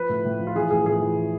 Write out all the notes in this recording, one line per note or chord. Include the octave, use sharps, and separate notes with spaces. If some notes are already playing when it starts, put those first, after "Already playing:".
Already playing: F3 B4
A2
A2
F3
F4
E3 G#4
A2 G#4
A2 G#4
E3